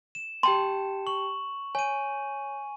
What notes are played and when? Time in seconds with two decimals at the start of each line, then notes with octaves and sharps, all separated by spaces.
0.15 E7
0.43 G4 G5 A5 C6
1.07 C#6 F#7
1.75 C#5 G#5 D#7